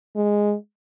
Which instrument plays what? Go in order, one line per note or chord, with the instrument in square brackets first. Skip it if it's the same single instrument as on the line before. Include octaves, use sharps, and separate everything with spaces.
[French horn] G#3